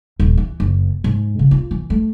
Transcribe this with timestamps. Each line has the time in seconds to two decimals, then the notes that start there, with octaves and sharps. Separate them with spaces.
0.20 D#1
0.37 E3
0.60 F#1
1.04 G#2
1.39 C#3
1.51 F4
1.71 E3
1.90 A3